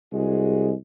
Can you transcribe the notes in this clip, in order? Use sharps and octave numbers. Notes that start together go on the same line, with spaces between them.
C2 G#3 F#4 G#4